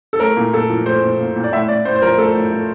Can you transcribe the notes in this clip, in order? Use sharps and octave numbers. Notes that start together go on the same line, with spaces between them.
A4
A3 A#4
A#2
A#2 A4
F3
A3 C5
A#2
A#2
A#2
D5
A2 E5
A2 D5
A2 C5
C5
F3 A#4
A3 A4
A2
A3